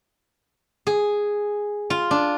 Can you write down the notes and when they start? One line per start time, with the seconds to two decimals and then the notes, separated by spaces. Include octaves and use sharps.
0.87 G#4
1.90 F4
2.11 D4